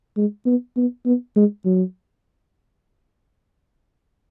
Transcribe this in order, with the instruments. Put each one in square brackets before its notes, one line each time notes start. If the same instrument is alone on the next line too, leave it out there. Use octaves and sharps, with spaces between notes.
[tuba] G#3
B3
B3
B3
G#3
F#3